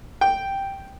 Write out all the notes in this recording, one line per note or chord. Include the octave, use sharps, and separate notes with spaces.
G5